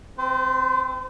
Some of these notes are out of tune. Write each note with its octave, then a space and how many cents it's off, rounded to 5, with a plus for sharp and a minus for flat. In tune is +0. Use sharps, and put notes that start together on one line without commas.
C4 +0 C5 -40